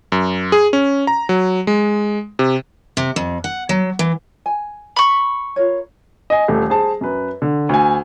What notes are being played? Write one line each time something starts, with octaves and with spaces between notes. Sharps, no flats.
F#2
G#4
C#4
A#5
F#3
G#3
C3
C3
F2
F#5
F#3
E3
G#5
B5 C#6
F4 A#4 C#5
D#5 G#5
D#1 A3
G#4 C5 A5
F#2 B4
D3
D2 G#5